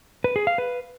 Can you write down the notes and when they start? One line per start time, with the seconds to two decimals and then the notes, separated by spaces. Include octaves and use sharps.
0.24 B4
0.36 G#4
0.47 F5
0.58 B4